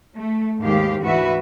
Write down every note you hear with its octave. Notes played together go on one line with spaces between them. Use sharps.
A3
D#2 G#2 D#3 G4 F5
D2 G#2 E3 F#4 B4 E5